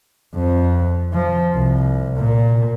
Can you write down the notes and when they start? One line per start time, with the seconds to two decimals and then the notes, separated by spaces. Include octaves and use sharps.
0.35 F2
1.13 F3
1.55 C2
2.17 A#2